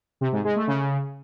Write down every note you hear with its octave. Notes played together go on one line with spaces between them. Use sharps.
C3
G#2
G#3
A3
C#3